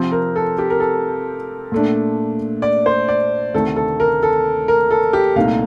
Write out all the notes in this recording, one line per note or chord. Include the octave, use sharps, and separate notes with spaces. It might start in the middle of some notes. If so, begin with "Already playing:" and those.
Already playing: C3 F3 C4
A#4
A4
G4
A#4
A4
A#2 A3 D4
D5
C5
D5
D2 C3 D#3 A3 A4
A4
A#4
A4
A#4
A4
G4
C2 A#2 A3 D#4 F5